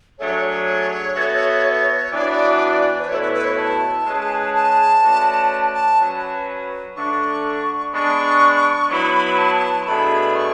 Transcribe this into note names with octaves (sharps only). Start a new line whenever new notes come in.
F#3 A3 D4 G#4 C#5
B3 F#4 A4 E5
E3 B3 D4 F#4 D5
B4
B2 A3 E4 C#5
B4
B4
C#5
A5
G#3 C#4 G#4 B4
A5
A3 C#4 F#4 B4 D5
A5
F#3 C#4 F#4 B4
D3 A3 D4 C#6
G#3 B3 D4 C#6
F#3 B3 E4 B4 B5
A5
C#6
B2 A3 D4 G#4 B5
C#6